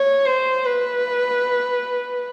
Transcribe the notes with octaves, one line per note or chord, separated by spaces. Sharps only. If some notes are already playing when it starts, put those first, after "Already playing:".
Already playing: C#5
C5
B4